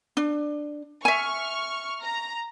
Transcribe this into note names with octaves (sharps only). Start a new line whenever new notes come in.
D4
E5 G#5 C#6 F6
A#5